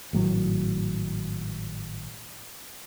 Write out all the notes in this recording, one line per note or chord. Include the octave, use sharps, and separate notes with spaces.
G#1 A2 F#3